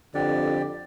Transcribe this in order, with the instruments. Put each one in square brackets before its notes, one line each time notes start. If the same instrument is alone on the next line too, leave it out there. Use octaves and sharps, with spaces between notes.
[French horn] F2 [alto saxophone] D3 [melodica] G4 D5